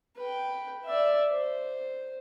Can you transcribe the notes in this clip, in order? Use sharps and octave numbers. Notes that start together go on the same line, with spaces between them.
B4 G5
D5 E5
C5